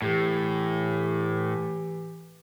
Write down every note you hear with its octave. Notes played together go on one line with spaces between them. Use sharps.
A2 E3 G4